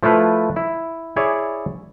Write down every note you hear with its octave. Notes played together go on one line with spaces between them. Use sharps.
F3 A3 E4 F4 B4
E4
E4 G#4 C#5 D5